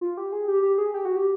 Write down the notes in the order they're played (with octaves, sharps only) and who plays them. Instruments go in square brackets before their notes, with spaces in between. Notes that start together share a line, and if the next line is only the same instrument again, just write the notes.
[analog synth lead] F4
G4
G#4
G4
G4
G#4
G4
F#4
G4